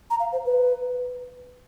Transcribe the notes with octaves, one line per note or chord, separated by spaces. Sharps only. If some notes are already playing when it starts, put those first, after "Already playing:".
A#5
F5
C5
B4